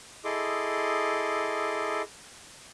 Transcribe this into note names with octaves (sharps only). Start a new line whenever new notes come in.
E4 G#4 A4 D#5 C6 D6